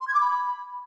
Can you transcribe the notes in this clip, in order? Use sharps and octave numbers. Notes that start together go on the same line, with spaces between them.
C6
G#6
D6
B5